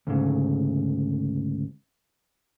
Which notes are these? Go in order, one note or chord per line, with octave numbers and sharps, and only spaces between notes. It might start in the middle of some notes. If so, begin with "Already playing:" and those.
D2 G#2 C#3